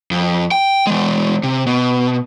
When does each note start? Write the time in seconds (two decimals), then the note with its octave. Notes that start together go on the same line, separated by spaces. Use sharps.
0.11 F2
0.51 G5
0.87 E3 G#3
1.43 C3
1.67 B2